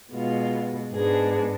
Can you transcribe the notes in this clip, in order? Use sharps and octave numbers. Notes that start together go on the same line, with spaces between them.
B2 G#3 B3 F4
G#2 G#3 B3 D4 G#4